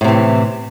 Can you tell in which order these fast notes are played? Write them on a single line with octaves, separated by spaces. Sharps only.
A2 C3 E3